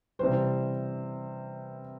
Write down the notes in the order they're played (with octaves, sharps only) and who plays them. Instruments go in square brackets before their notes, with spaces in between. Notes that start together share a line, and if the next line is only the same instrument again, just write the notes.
[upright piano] C3 E3 G3 C5